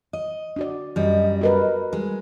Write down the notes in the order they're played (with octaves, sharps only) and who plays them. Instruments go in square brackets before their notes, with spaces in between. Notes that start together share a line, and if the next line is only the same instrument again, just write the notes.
[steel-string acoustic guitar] D#5
[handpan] D4 F#4 D5
[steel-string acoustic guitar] F#2 G3 [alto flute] D#5
[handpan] F#4 A#4 B4
[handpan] G3 [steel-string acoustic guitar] G#3